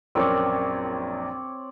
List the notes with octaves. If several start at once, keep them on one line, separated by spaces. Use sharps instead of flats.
A#1 F#2 C4 A#4 C#5 D5